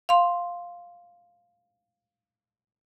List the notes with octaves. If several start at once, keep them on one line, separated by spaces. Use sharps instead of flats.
F5 C6